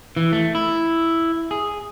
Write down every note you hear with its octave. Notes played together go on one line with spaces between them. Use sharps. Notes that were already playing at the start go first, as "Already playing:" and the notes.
E3
A3
E4
G#4